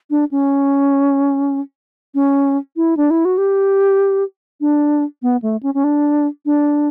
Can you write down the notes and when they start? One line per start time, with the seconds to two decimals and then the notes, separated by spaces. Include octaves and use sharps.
0.10 D4
0.31 C#4
2.14 C#4
2.76 E4
2.97 D4
3.10 E4
3.25 F#4
3.38 G4
4.61 D4
5.22 B3
5.42 A3
5.63 C#4
5.74 C#4
5.84 D4
6.45 D4